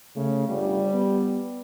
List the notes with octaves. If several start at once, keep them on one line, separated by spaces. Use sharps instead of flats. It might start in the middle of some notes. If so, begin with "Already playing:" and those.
C#3 A3
G1 G3
B3